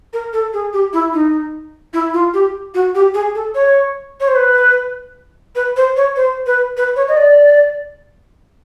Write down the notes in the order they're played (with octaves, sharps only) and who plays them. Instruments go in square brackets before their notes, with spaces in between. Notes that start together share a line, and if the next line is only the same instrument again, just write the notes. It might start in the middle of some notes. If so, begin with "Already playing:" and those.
[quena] A#4
A4
G#4
G4
E4
D#4
E4
F4
G4
F#4
G4
G#4
A4
C#5
C#5
C5
B4
B4
C5
C#5
C5
B4
B4
C#5
D#5
D5